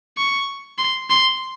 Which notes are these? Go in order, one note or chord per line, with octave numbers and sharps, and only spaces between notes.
C#6
C6
C6